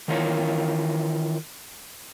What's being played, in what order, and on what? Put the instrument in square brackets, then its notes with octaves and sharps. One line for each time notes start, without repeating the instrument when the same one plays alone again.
[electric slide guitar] D#3 E3 F4 A#4 C#5